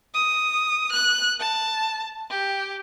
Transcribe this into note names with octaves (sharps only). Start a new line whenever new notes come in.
D#6
F#6
A5
G4